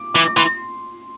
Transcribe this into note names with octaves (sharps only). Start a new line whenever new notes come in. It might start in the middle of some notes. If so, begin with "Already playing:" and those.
Already playing: D6
E3 D6
D6
E3 C6